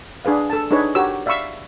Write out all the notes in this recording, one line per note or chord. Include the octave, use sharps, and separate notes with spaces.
D4 G#4 B4 F5
A4 A5
D4 D#4 G#4 B4 C#5
F#4 G4 A#4 C#5 E6
D5 E5 F5 B5 C#6 E6